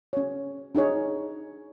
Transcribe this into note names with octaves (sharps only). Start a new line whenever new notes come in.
C#4 C#5
D4 D#4 G#4 C#5